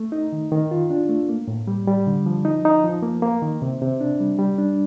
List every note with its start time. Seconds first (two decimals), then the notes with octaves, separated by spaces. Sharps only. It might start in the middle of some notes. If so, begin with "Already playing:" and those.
Already playing: A3
0.12 D#4
0.33 D#3
0.52 D#3
0.71 F4
0.90 D4
1.09 A3
1.29 A#3
1.48 A2
1.68 G3
1.87 G3
2.07 D3
2.26 F3
2.45 D#4
2.65 D#4
2.84 F3
3.03 A#3
3.22 A#3
3.42 D#3
3.62 C3
3.81 C3
4.01 D4
4.20 G3
4.39 G3
4.58 D4